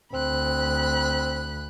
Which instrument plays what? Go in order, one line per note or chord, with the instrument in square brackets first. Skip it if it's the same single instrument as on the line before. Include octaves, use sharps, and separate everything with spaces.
[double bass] D2 [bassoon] C4 [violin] B5 F#6